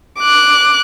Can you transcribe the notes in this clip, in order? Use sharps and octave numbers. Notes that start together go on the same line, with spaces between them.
D6 F#6